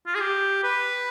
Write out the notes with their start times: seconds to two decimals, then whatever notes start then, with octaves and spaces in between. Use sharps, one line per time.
0.07 F4
0.15 G#4
0.20 G4
0.64 B4